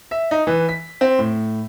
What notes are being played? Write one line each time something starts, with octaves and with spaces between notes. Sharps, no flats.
E5
D#4
E3
B6
C4
A2